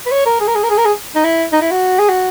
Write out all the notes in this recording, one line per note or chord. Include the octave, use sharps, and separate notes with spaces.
B4
C#5
A#4
G#4
A#4
G#4
A#4
G#4
A#4
G#4
D#4
E4
D#4
E4
F#4
G#4
F#4